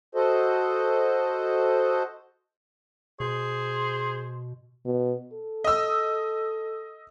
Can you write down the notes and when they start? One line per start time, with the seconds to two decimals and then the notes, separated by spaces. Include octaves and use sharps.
0.15 F#4 A4 C5 D#5
3.20 B2 G#4 C5
4.85 B2
5.33 A4
5.64 D#5 E6